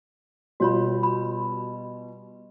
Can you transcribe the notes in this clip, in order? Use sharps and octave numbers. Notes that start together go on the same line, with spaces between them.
B2 G3 F4 F#4 C#5 B5
B5